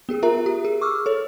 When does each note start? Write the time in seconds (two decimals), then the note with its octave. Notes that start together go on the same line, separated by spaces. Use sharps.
0.09 B3 G4 G#4
0.23 F4 A#4 E5 A#5
0.46 G4
0.65 G#4
0.81 C#6 D6 E6 F6
1.06 A4 C#5